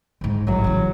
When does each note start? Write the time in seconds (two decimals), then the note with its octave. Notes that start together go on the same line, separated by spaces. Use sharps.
0.21 D2 G#2
0.47 A1 G#2 F#3
0.64 C#3 E3